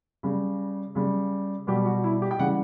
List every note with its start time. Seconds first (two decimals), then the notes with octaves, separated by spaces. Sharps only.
0.23 C#3 G3
0.95 C#3 G3
1.67 B2 G3 G4
1.86 F#4
2.04 E4
2.22 G4
2.31 G5
2.39 C#3 E3 G3 F#5